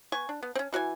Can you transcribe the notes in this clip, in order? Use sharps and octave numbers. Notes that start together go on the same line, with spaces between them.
B3 G#5 C#6
D4
B3
C4 C#4
E3 F#4 F5 G#5